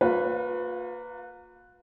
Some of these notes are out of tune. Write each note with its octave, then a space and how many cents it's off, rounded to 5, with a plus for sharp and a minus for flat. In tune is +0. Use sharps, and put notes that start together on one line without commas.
A#3 -20 F4 +45 B4 +0